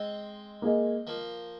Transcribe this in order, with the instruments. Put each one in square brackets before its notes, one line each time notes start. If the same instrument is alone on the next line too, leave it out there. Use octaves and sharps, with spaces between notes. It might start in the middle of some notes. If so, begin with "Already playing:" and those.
Already playing: [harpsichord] G#3 C4
[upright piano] A#3 G#4 D#5
[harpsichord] F3 A#3